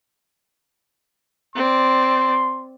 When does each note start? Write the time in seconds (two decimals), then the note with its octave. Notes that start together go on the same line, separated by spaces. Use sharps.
1.56 C4 D5 C6